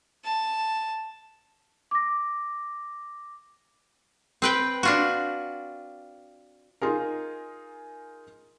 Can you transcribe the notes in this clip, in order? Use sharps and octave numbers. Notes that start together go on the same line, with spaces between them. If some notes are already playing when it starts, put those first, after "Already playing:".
A5
D6 A#6
C4 B4 G5
D4 F4 F#4
D#4 F4 G#4 A#4